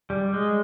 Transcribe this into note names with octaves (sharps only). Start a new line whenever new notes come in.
G3
G#3